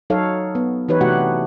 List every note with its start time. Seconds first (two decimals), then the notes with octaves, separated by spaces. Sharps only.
0.10 F#3 D#4 A4 C#5 F5
0.55 B3
0.89 E3 D#4 G4 B4 C#5
1.01 C3 A3 D4 F#4 G4 F#5